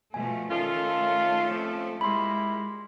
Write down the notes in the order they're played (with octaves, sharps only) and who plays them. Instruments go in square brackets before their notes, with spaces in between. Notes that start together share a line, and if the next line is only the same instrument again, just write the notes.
[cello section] B2 F3 A3 [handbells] G#5
[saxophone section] D#3 F4 [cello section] A3 C#4 A4
[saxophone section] F2 F3
[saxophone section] A#2 G3 E4 [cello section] G#3 [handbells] B5 C6